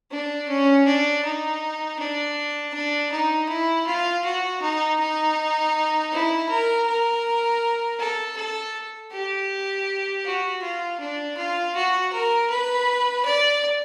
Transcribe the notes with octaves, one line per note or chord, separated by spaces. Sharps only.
D4
C#4
D4
D#4
D4
D4
D#4
E4
F4
F#4
D#4
D#4
E4
A#4
A#4
A4
A4
G4
F#4
F4
D4
F4
F#4
A#4
B4
D5